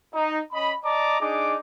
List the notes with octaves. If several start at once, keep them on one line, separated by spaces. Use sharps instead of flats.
D#4
C#4 D#5 B5
D5 D#5 A5 A#5 D6
D4 D#4 G#4 D6